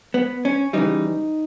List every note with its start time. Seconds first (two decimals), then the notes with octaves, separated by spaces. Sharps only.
0.14 B3
0.45 C#4
0.73 C#3 E3 G3 D#4